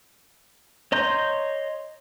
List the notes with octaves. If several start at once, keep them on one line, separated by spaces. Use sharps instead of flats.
C#5 D#5 A#5 C6 G6